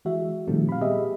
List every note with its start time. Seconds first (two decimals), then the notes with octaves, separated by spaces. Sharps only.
0.05 E3 G#3 F#4 E5
0.47 A#2 D#3 F3 G3 A3 C4
0.69 F5 B5
0.81 G3 B3 G4 G#4 D#5 E5